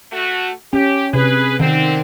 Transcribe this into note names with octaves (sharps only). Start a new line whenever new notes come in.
A3 F#4
C#4 G4
C3 G#4 B4
D3 D#3 C4